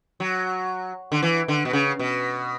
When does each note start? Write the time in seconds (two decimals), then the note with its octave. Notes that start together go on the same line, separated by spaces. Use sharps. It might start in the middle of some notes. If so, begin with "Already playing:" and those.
0.20 F#3
1.12 D3
1.23 E3
1.48 D3
1.65 B2
1.73 C#3
1.99 B2